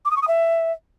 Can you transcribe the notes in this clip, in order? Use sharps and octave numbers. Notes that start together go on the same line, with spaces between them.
D6
D#6
C#6
D#6
E5